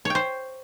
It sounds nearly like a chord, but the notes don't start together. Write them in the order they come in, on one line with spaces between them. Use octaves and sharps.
C#5 G5 C5